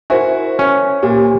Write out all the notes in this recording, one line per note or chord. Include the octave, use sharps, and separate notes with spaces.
E4 F#4 A#4 C5 G#5
C#4
A#2 G4